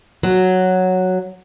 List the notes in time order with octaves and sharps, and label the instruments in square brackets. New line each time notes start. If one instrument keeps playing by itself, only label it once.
[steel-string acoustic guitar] F#3